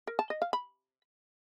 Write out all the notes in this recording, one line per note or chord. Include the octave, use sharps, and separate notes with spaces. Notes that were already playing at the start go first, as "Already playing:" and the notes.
A#4
A5
D#5
F5
B5